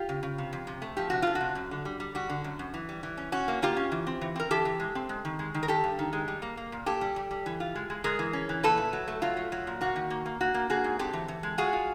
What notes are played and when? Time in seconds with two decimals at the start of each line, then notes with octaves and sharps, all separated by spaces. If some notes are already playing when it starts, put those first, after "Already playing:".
Already playing: F4 G4
0.09 C#3
0.23 C#3
0.38 C3
0.53 F2
0.67 C3
0.82 A3
0.97 F3 G4
1.10 C3 F#4
1.22 A3 F4
1.35 F#4
1.41 C3
1.55 F#2
1.71 D3
1.85 G3
2.00 G3
2.15 G3 F#4
2.29 D3
2.44 F#2
2.59 F#2
2.74 E3
2.89 G3
3.03 E3
3.17 C#4
3.32 C#4 F#4
3.48 A#3
3.62 A#3 F4 G4
3.77 C#4
3.92 E3
4.07 C4
4.21 E3
4.36 C4 A#4
4.51 E3 G4 A4
4.65 E3
4.80 G#3
4.95 C4
5.09 G#3
5.25 D#3
5.39 G#3
5.54 D#3
5.63 A#4
5.68 D#3 G4 A4
5.84 G2
5.99 D#3
6.13 G#3
6.28 G3
6.42 A#3
6.57 A#3
6.72 A#2
6.86 A#2 G4 A4
7.01 G3
7.16 G3
7.31 G3
7.46 E3
7.60 F4
7.75 G#3
7.90 G#3
8.04 G#3 G#4 A#4
8.19 E3
8.33 C#4
8.49 E3
8.63 A#2 A4 B4
8.78 A3
8.93 F#3
9.08 A3
9.22 F#3 F4
9.37 A3
9.52 F#3
9.67 A#2
9.81 A#3 F#4
9.96 D#3
10.10 A#3
10.26 A#3
10.41 A#3 F#4
10.54 A#3
10.70 A#3 F#4 G#4
10.84 G#2
10.99 C4 G4 A4
11.13 E3
11.28 E3
11.43 G#3
11.58 F4 F#4 G#4
11.73 F4